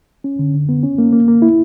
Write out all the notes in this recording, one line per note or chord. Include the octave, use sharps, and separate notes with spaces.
C#4
D3
D3
B3
C#4
A#3
A#3
A#3
E4